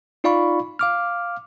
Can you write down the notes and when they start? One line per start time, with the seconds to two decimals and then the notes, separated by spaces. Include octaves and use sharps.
0.24 D#4 F4 D5 F5 B5 C#6
0.79 F5 D6 F6